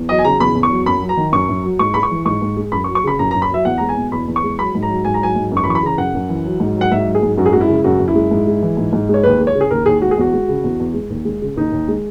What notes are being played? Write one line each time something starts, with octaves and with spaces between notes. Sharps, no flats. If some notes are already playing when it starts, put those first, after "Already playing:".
Already playing: E2
F#3 D#5
G#5
C#3 A#5
E2 B5
E2
C#6
F#3
F#2 B5
F#3
A#5
D#3
F#2 C#6
F#2
F#3
G#2 C#6
G#3 B5
C#6
E3
G#2 C#6
G#2
G#3
F#2 B5
C#6
F#3
C#6
C#3 B5
F#2 A#5
A#5
F#2
B5
F#3 E5
E2 F#5
G#3 A#5
G#5
B2
E2 B5
E2
C#6
G#3
F#3 B5
G#2
A#5
F#3
G#2 G#5
A#5
F#3 G#5
G#2
F#2
C#6
B5
E3 C#6
B5
C#3 A#5
F#2 F#5
F#2
E3
F#3
G#2
F#3
F#5
G#2 E5
F#3
G#4
G#2
F#2 F#4
G#4
G#3 F#4
E4
C#3
F#2 F#4
F#2
E4
G#3
G#2
G#3
E3
G#2
G#2
G#3 C#5
D#2 B4
G#3
C#5
C#3
G#4
D#2 A#4
D#2 G#4
G#3 F#4
G#4
E2 F#4
G#3
C#3
E2
E2
G#3
D#2
G#3
C#3
D#2 D#4
D#2
G#3